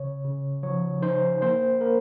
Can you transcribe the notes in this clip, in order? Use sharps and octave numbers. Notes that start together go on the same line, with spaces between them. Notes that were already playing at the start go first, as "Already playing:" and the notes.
Already playing: C#3 C#5
C#3
F3 C#5
D#4 C5
A#3 C5
A#3 A#4